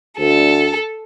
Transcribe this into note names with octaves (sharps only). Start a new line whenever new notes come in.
D2 A4